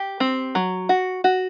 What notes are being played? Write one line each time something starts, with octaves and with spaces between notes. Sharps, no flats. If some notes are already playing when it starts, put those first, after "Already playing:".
Already playing: G4
C4
F#3
F#4
F#4